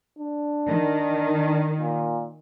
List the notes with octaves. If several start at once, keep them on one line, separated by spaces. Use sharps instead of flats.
D4
D#3
A#2